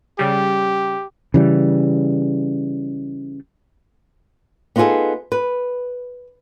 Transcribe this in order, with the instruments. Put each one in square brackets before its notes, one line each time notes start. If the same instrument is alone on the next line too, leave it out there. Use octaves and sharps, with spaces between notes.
[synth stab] C#3 G3 [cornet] G4
[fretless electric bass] C#3 E3 G3
[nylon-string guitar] B3 D#4 F4 F#4 G#4 A4
B4